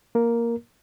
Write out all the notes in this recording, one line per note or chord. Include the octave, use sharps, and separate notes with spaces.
A#3 A#4